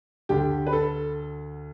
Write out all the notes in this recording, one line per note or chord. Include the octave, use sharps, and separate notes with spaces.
D2 D3 G4
B4
A4